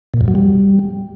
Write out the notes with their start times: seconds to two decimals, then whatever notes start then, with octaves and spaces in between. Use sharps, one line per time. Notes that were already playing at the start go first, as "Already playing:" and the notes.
0.14 A#2
0.21 F2
0.28 F#3
0.35 G3